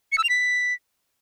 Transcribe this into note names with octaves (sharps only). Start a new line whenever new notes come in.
C#7
E6
F7
B6